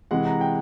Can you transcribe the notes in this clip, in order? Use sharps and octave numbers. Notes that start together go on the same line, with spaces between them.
C3 E3 G#3 F#5
A#5
G5